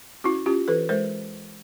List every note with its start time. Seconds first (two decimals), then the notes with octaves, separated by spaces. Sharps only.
0.24 C#4 E4 F#4
0.46 C#4 F4 G4
0.68 E3 A4 B4
0.89 G#3 A#4 C5